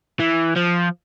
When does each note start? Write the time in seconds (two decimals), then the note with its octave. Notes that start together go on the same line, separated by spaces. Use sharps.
0.20 E3
0.56 F3